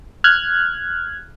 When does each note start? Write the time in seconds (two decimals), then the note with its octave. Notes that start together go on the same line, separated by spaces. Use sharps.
0.24 F6 F#6 G#6